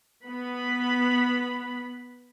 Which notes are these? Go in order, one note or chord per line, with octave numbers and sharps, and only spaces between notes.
B3 B5